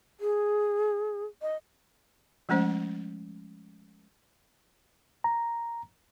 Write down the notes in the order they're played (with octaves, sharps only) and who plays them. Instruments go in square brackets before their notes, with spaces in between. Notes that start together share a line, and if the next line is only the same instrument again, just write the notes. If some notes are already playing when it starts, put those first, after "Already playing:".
[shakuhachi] G#4
D#5
[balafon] F3 G#3 A3 C#4 C5
[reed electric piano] A#5